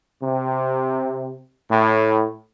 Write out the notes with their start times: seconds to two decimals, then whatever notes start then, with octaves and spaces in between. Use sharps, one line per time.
0.23 C3
1.69 A2